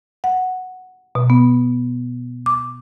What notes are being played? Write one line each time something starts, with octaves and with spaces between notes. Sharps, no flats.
F#5
B2
B3
D6